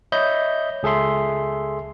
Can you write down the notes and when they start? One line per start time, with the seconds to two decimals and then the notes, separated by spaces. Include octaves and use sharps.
0.12 C#5 D#5 E5 B5 G6
0.83 C#2 G#4 A4 E5 C6